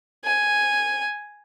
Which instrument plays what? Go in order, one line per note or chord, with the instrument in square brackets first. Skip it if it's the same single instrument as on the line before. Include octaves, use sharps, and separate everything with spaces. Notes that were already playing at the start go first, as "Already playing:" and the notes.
[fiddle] G#5